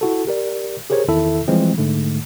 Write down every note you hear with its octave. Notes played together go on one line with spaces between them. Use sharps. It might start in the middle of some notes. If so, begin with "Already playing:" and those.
E4 F#4 A4
G4 A#4 D5
G4 G#4 A#4 C5 C#5
E2 D#3 E4 A4 E5
E3 F3 G3 G#3 C4 E4
G#2 D3 A3